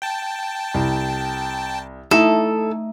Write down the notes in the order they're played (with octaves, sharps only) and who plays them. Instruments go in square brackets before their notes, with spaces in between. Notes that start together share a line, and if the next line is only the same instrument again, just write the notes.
[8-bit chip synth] G5 A5
[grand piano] C2
[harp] A3 D#4 [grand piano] E4 [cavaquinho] A4